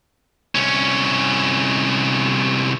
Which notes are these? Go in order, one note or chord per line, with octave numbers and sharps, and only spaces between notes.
C2 C#4